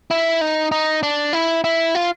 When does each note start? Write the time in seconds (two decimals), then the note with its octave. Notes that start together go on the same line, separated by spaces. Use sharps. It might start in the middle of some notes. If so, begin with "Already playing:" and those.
0.11 E4
0.41 D#4
0.72 D#4
1.03 D4
1.33 E4
1.64 E4
1.95 F4